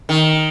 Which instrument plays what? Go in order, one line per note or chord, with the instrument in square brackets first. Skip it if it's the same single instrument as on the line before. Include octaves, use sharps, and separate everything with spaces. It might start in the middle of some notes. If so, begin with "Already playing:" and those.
[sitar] D#3